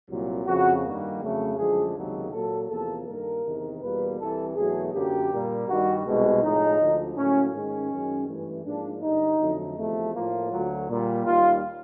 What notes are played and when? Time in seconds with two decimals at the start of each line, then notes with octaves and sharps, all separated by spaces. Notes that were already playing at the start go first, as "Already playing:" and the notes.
0.09 C2 A#2 F#3
0.46 F2 C#3 F3 F#4
0.83 G2 D#3 G3 A#3
1.21 F2 C#3 F#3 A3
1.57 F#2 D3 F3 G#3 G#4
1.95 C#2 C3 D#3 F#3 A#3 A4
2.32 A#2 F#3 A#3 A4
2.70 E2 C3 F3 A#3 A4
3.06 G2 D#3 G3 A#3 A#4
3.44 E2 C3 D#3
3.81 E2 B2 G3 A#3 B4
4.18 C2 C3 E3 A4
4.55 E2 B2 F#3 A3 G#4
4.92 F#2 D3 F#3 A#3 G4
5.30 A#2 G3 A#3
5.67 G2 D#3 G3 F#4
6.05 C2 B2 G#3
6.42 A2 F3 G#3 D#4
6.79 D2 D3 F3
7.16 A2 F#3 A#3 C#4
7.53 G#2 D#3 G#3 C#4
7.91 F#2 D#3 G#3
8.27 G2 E3 A3
8.64 G#2 F3 A#3 D4
9.02 G2 D3 G3 D#4
9.39 F2 D3 F#3 A3
9.77 E2 C3 F3 A3
10.14 A2 F3 A#3 F4
10.51 D2 D3 F#3
10.89 A#2 G3 A#3
11.25 D#2 D#3 G3 F4